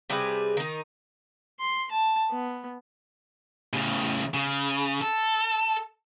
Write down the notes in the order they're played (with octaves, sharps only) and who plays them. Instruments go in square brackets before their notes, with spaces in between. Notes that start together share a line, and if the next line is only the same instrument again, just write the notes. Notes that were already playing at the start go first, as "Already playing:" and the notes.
[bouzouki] C3 G3 G#4 B4
D#3 D#4
[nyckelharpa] C6
A5
B3
[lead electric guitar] A2 C#3
C#3
A4